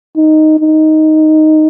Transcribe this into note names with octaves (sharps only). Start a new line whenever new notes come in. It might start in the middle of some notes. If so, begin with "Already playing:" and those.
D#4
D#4